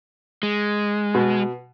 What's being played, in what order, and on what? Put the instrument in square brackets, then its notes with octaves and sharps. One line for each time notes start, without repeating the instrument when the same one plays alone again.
[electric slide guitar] G#3
[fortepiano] B2